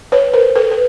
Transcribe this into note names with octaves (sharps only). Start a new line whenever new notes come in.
B4 C#5
A#4 C5
A4 B4
B4